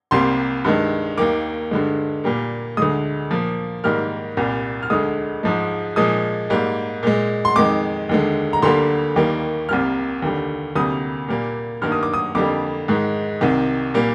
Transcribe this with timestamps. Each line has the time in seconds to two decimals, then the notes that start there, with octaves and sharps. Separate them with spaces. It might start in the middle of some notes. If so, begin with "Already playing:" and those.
0.11 C2 C3 G3 A#3 C6
0.65 G2 D#3 G#3
1.18 D#2 D#3 A#3 D6
1.71 G2 D3 G#3
2.24 A#2 G3 A#3
2.77 D2 D3 G#3 D#6
3.31 A#2 F3 A#3
3.84 G#2 D#3 G3 A#3 F6
4.37 C2 A#2 G3
4.83 F6
4.90 D2 D3 G#3 D#6
5.43 G#2 F3 G#3
5.96 A#2 F3 G#3 D#6
6.50 G#2 G3 A#3
7.03 A#2 G#3
7.45 C6
7.56 F2 D#3 G#3 D6
8.09 D#2 D3 G#3
8.53 A#5
8.62 D2 D3 G3 A#3 C6
9.16 D#2 D#3 G3 A#3
9.69 C2 C3 G3 A#3 F6
10.22 D#2 D3 G3
10.76 D2 C3 G3 A#3 D#6
11.28 A#2 G3 A#3
11.82 G2 D#3 A#3 F6
11.92 D#6
12.03 D6
12.14 D#6
12.35 F2 D3 G3 A#3 D6
12.88 G#2 D#3 G#3
13.41 C2 C3 D#3
13.94 A#2 G3 A#3